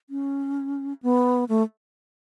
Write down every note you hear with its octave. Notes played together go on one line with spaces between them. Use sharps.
C#4
B3
A3